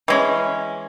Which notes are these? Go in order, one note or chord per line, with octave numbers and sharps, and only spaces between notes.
E3 G#3 C#4